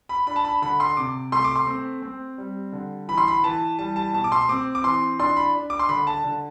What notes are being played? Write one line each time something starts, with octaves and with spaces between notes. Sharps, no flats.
B5
D4 B5
A5
B5
D3 B5
C6
C3 D6
A3 C6
D6
C6
C4
C4
G3
D3
E3 B5
C6
B5
E3 A5
G3 A5
A5
B2 A5
D6
C6
C4 D6
D6
E3 C6
D4 C6
B5
D4
D6
C6
D3 B5
A5
D3